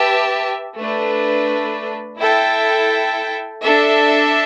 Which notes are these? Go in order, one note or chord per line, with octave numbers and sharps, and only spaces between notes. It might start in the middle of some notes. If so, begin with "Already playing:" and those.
Already playing: G4 B4 E5 A5
A3 D4 B4
E4 A4 E5 G5
D4 A4 E5